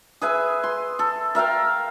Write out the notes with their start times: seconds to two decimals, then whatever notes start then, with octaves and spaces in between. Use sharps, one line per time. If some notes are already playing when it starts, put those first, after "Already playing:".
0.21 G#4 B4 E5 G#5
0.64 C6
0.99 A4
1.35 A#4 E5 F5 G5